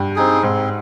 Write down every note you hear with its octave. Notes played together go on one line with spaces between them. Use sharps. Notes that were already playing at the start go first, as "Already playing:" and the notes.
Already playing: G2
C4 D#4 G#4
G#2 C4